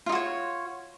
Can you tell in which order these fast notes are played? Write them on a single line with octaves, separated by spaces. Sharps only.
F4 D#4 F#4 C#5